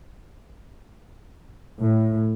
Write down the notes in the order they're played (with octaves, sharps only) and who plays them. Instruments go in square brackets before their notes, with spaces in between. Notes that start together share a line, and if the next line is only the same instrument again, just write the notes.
[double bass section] A2